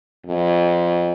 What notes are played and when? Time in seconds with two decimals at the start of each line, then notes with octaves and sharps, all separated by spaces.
0.26 F2